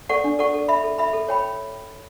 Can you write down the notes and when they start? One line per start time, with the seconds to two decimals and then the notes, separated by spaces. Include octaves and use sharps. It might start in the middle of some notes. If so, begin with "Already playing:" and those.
0.09 A4 D5 F#5 C#6
0.24 D4
0.39 A4 D5 F#5 C#6
0.54 A4
0.68 E5 B5
0.84 A4
0.98 E5 B5
1.13 A4
1.28 C#5 G5 B5